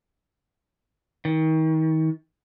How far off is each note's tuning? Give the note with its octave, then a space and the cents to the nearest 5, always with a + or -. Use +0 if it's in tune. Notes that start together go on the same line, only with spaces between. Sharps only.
D#3 +35